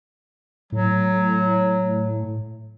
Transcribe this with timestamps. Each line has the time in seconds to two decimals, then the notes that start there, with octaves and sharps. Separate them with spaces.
0.72 A2 F#3